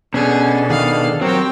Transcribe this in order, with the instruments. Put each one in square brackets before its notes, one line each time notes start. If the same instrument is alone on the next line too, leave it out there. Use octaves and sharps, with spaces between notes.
[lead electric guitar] B2 [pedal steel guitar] C#4 [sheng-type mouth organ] D4 A4 [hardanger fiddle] G#4
[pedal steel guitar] D#3 G#4 [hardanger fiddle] F5
[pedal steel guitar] F#3 [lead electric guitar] C4 [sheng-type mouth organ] G4 A#4 C#5 [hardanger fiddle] C5 G5